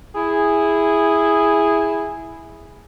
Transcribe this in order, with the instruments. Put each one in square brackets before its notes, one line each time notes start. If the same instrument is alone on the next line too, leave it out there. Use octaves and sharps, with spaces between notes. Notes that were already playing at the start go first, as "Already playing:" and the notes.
[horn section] E4 G#4